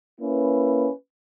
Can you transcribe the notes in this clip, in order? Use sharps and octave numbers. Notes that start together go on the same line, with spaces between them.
A#3 C#4 E4 B4